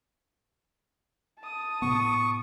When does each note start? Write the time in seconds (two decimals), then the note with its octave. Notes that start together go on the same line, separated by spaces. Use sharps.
1.40 A5 D#6
1.82 A2 C3 B3 C#6